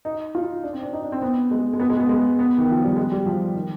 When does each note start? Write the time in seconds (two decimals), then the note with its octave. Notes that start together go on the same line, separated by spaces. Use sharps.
0.05 D#4
0.35 F4
0.63 D4
0.73 C4
0.82 D4
0.93 D#4
1.02 D4
1.12 C4
1.22 B3
1.51 G#3
1.73 G#3
1.79 B3
1.90 G#3
2.00 B3
2.09 G#3
2.39 B3
2.58 D#3
2.71 F3
2.84 G3
2.97 G#3
3.12 G3
3.26 F3
3.55 D#3